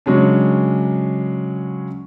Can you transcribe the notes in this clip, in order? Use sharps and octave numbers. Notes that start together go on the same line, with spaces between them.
C#3 F#3 G#3 C#4 D4